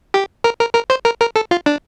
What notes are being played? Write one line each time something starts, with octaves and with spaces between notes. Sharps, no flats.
G4
A#4
A#4
A#4
C5
A#4
A#4
A4
F4
D4